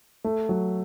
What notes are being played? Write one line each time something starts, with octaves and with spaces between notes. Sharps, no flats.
A3
F#3